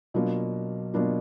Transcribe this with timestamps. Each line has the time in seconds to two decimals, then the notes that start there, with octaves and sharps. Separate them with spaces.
0.14 B2 F#3 A#3 D4 F4
0.94 B2 F#3 A#3 D4 F4